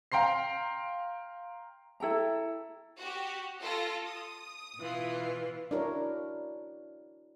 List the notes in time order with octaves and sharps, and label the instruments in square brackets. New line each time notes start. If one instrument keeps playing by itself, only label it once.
[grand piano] F5 G5 A#5 C6 C7
[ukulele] E4 A4 G5 A#5
[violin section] F#4 G4
F4 A4 A#6
D#6
[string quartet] B2 E3 F4
[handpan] D4 E4 F#4 A#4 C#5